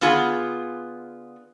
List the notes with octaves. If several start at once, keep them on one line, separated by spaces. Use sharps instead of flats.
D3 B3 F4 G#4